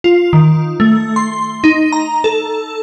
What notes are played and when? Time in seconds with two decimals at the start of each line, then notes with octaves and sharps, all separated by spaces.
0.04 F4
0.33 D#3
0.80 A3
1.16 C6
1.64 D#4
1.93 A#5
2.24 A4